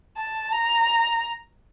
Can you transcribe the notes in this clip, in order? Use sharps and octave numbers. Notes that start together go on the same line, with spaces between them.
A5
A#5